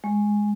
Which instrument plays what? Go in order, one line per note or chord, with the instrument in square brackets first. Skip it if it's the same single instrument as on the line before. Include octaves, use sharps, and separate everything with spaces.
[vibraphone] G#3